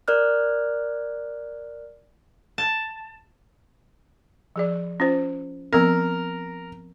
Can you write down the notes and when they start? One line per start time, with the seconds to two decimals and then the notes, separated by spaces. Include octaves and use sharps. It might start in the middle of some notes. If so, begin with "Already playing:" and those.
0.08 A#4 D5 F6 F#6
2.58 A5
4.56 F3 G#4 D5
5.00 C#4 F4 C5
5.73 F3 B3 C4 A#4